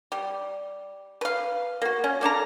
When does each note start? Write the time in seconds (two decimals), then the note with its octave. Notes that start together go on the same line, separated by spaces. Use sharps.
0.12 G3
1.21 B4 F5
1.82 A#3 F#4
2.04 C#4
2.21 A#3 D4 A4 A#5